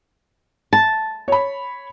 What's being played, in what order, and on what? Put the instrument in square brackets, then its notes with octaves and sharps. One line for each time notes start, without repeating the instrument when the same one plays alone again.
[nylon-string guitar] A5
[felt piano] C#5 B5